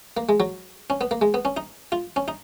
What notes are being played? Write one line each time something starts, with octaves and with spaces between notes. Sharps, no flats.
A#3
G#3
F#3
C#4
B3
A#3
G#3
B3
C#4
D#4
F4
C#4
D#4